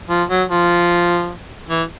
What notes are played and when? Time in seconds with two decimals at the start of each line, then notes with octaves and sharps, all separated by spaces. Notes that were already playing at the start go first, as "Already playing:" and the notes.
0.09 F3
0.29 F#3
0.49 F3
1.69 E3